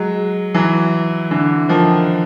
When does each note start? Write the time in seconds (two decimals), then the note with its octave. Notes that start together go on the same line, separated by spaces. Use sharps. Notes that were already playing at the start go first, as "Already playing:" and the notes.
Already playing: F#3 G#3
0.54 E3 F#3
1.31 D3 E3
1.69 D#3 F3